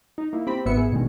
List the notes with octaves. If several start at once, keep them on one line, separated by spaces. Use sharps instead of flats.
D#4
A#3 E4
C4 G4 B5
G#1 B3 E5 C#7
G#4
A1 B2 D3 D#3 G#3 G#4